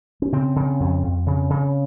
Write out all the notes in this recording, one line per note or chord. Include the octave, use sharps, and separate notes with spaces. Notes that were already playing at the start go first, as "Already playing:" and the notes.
C#4
C#3 C4
C#3
F2
F2
C#3
C#3